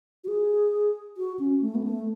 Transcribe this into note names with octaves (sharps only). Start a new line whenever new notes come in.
F#4
G#4
F#4
C#4
A3
B3
A3